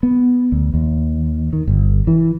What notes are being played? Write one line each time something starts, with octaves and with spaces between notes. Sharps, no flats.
B3
D2
D#2
D#3
G1
E3